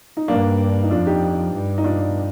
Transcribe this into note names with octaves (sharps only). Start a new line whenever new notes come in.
D#4
G2 A#3 D4
D#4
F2 D4 F4
D#4 G4
G2
D#4
D4 F4